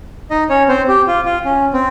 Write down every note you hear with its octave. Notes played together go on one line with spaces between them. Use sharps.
D#4 D#5
C#4 C#5
C4 C5
G4
F4
F4
C#4
C4